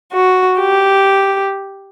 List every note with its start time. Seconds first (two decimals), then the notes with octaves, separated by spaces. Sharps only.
0.13 F#4
0.60 G4